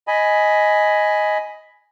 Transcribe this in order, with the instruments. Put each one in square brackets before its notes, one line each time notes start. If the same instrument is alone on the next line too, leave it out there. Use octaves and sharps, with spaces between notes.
[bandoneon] D#5 G#5 B5